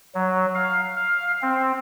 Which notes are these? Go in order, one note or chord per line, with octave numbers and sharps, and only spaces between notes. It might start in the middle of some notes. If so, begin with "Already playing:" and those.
F#3
F5
F5
C4